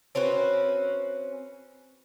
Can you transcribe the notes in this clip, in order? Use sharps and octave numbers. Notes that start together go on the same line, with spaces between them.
C4 C#4 F#4 B4